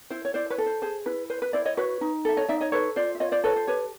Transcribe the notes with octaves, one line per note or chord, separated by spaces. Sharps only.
E4 C5
C#5
E4 C5 D5
B4 C#5
A4
C5
G#4 C5
E4 B4
B4 C5
B4
E4 C5 D5
C#5 D#5
F#4 B4 C#5
D#4
A4 E5
C#5 D#5
D#4 D5 E5
C#5 D#5
A4 B4 C#5
F4 C5 D5
E5
F4 C#5 D#5
C5 D5
A4 B4 C#5
C5
G4 B4 C#5